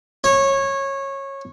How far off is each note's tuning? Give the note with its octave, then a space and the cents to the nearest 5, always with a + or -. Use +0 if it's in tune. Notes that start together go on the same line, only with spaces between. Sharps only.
C#5 -20